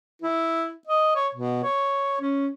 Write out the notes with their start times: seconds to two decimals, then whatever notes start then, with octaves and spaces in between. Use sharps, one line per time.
0.22 E4
0.87 D#5
1.15 C#5
1.35 B2
1.63 C#5
2.21 C#4